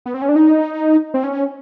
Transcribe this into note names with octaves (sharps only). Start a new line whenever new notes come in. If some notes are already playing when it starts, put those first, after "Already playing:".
B3
C4
C#4
D4
D#4
C4
C#4